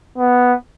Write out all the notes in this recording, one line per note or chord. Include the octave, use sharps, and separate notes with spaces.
B3